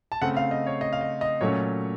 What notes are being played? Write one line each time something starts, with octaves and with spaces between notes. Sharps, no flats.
A5
C#3 A3 C4 F#5
F5
D#5
C#5
D#5
F5
D#5
D#5
A#2 F#3 A3 C#4 C#5